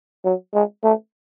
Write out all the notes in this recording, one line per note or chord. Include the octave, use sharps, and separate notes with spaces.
F#3
G#3
A3